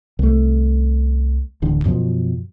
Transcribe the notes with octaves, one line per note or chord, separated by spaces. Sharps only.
C2 A3
D1 A1 D3
F#2 B2 F3 F#3